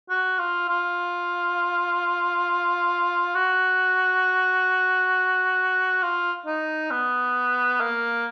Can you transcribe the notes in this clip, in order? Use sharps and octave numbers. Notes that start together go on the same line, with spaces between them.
F#4
F4
F4
F#4
F4
D#4
B3
A#3